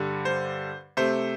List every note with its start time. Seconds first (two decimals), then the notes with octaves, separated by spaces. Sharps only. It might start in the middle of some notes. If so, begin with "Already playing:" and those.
Already playing: G2 D3 G3
0.25 C5
0.97 C3 A3 C5